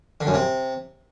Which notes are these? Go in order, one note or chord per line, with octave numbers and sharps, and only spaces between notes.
D3
F#2
C3